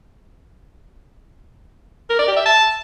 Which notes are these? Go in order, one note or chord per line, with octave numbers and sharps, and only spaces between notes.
A#4
D5
G4
E5
A5